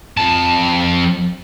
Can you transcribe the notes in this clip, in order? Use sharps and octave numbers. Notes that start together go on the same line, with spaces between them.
F2 A5